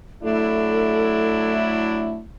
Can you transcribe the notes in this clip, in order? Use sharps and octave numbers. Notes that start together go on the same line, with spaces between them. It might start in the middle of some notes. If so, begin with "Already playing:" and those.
F#3 A3 D4 E4 A4